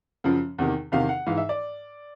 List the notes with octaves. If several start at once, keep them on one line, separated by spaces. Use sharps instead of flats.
F#2 C#3 F3
E2 C3 D#3
E2 C3 D#3 F5
F#5
G#2 E3 F5
E5
D5